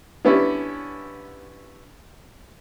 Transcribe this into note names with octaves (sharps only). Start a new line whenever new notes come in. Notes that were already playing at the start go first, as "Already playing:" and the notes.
D3 G3 B3 C#4 E4